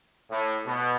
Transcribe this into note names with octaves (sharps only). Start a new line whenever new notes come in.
A2
B2